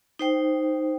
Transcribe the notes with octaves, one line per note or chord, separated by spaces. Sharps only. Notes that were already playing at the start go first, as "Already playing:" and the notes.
D#4 C5 G5